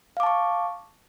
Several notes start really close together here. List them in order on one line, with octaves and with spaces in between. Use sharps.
F5 D6 A5 C#6